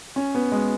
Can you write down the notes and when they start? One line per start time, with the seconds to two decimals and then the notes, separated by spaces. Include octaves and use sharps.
0.16 C#4
0.35 B3
0.52 G#3